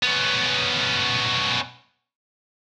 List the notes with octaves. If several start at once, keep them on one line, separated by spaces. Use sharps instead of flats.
B3 C#4